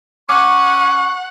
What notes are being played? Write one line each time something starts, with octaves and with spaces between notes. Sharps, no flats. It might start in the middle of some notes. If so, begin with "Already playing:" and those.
C#4 F#5 C#6 D6